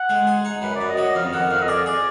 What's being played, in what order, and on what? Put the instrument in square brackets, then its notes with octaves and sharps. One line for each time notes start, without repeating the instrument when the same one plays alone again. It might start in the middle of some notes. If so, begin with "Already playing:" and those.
Already playing: [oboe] F#5
[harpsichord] G#3
G#4
D#4
[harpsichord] F#2 [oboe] B4
[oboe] D5
[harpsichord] F#2
[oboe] D#5
[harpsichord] F#3
[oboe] D#5
[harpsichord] F2 [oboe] F5
[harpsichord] D#3 [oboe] F#5
[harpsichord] F2 [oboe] F5
[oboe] D#5
[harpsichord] G#4 [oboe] D5
[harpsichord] G#4 [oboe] D5